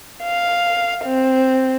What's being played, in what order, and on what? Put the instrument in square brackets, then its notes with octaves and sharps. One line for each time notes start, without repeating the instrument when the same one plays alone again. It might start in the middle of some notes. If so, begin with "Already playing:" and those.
[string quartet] F5
C4